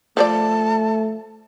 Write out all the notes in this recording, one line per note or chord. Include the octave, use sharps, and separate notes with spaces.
F3 A3 C5 D5 A5